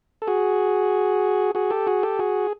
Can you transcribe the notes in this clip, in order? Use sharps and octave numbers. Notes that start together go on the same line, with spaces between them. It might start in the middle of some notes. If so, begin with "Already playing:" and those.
A4
F#4 G#4
F#4 G#4
G4 A4
F#4 G#4
G4 A4
F#4 G#4